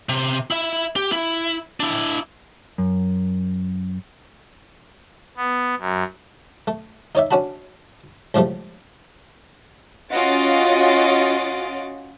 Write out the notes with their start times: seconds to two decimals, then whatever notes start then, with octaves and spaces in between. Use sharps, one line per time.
0.09 C3
0.51 E4 E5
0.96 G4
1.12 E4
1.80 D4 E4
2.78 F#2
5.37 B3
5.79 F#2
6.67 A3
7.15 D#4 C#5 D5 E5
7.31 C#4 D4 F#4 A5 B5
8.34 C#2 A2 F3 G3 A3
10.10 C#4 F4 F#4 D#5 A6 D7